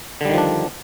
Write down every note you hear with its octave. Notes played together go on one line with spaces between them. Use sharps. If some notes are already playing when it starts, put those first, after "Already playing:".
D3 D#3 F3 G3 D4